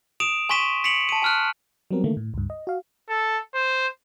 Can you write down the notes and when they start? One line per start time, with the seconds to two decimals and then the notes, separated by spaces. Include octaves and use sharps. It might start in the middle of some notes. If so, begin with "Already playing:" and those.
0.20 D#6 D7 E7 F7
0.49 G#5 C6 C#6 B6 D#7 E7
0.84 B6 C#7 D7 F7 F#7
1.09 A5 D#7
1.22 G#5 F6 F#6
1.91 F#3 G3 B3 C4 A#4
2.04 D3 D#3 A3 A#3
2.17 A2
2.34 C#2 G2
2.50 D#5
2.67 F#4 F5
3.10 A4
3.55 C5